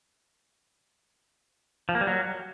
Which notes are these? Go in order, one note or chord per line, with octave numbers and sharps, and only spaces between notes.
F3
A#3
G3
F#3